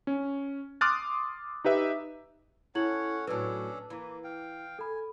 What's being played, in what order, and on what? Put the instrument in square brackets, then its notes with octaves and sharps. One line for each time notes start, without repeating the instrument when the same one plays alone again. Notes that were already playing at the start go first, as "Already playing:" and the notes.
[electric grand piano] C#4
C6 D6 D#6 F6 F#6 A6
D#4 G4 B4 E5
[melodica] C#4 C#5 F#5 [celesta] E4 G#6 F#7 [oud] A4
[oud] A2 F#3 [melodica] C#4 D4 A4 [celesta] B4
[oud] E3 [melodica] A#3
[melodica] F5 G5
[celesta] A4 B5 [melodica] G#5